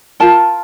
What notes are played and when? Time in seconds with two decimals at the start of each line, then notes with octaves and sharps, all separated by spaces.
0.20 F4 A#4 A5